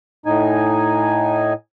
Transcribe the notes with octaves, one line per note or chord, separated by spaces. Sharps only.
A2 D#4 G#5